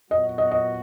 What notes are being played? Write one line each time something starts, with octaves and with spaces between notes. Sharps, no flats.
A#2 F#3 B3 F#4 D#5
D#5
D#5